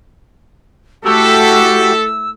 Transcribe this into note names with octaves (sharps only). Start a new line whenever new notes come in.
A3 E4 F#4 G4 A4 E6